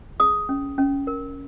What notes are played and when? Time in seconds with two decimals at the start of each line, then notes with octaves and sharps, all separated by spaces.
0.20 G#4 D#6
0.49 C#4
0.78 C#4
1.07 A#4